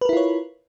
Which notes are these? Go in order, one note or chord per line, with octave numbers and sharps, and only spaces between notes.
E4 F4 A#4 B4 C#5